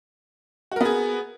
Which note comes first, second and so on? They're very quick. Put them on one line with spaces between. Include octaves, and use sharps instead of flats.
F#4 A#4 B3 G#4